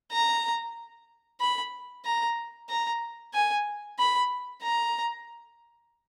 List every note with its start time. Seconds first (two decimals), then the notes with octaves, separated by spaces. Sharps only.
0.12 A#5
1.40 B5
2.05 A#5
2.69 A#5
3.34 G#5
3.99 B5
4.62 A#5